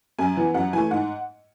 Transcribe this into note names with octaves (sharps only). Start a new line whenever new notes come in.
F#2 G#5
E3 B3
F#2 F#5
E3 A3 G#5
G#2 F#5